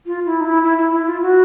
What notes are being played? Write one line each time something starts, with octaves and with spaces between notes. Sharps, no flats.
F4
E4
D#4
E4
E4
E4
E4
F4
F#4